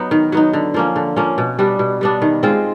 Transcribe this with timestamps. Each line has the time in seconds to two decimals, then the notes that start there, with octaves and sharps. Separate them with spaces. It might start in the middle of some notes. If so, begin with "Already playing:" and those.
Already playing: F#3 B3 D#4
0.11 D#3
0.32 F#3 B3 D#4
0.53 D3
0.74 F3 A#3 C#4
0.96 D3
1.16 F3 A#3 C#4
1.38 B2
1.59 G3 B3 D4
1.79 B2
2.01 G3 B3 D4
2.22 D#3
2.43 G#3 C4 F4